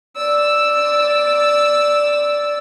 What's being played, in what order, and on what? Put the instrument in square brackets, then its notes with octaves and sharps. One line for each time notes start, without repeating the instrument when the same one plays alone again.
[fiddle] D5 E6